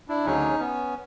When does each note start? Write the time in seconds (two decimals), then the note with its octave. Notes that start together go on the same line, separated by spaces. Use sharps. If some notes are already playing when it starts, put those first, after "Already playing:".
0.08 D4 E4
0.25 D2 C#3 F#3 C#4 D#4
0.59 B3 C#4